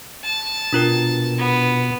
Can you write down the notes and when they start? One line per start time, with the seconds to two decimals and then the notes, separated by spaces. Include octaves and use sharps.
0.24 A5
0.73 B2 D4 F4 A#4
1.38 B3